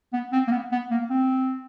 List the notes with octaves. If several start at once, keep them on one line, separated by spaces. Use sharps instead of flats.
B3
C4
A#3
B3
B3
A#3
C4